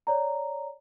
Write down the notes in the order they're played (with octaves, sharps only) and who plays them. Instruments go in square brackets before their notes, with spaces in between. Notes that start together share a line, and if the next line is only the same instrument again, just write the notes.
[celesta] C#5 D5 A#5